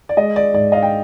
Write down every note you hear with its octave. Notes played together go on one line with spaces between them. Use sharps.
D5
G#3 D#5
D5
G#2 D5
D#5 F5
G5